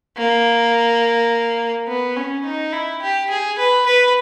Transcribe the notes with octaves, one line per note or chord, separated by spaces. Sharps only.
A#3
B3
C#4
D#4
E4
G4
G#4
B4
B4